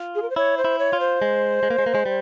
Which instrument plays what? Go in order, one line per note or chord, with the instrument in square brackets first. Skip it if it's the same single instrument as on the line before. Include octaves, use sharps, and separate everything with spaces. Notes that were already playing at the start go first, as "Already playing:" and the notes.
Already playing: [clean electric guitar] F4
[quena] G#4
A#4
C5
[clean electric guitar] E4 [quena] C#5
[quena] C5
[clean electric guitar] E4
[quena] C#5
[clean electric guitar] F4
[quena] C5
[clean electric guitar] G#3
G#3
A#3
G#3
A#3
G#3
G3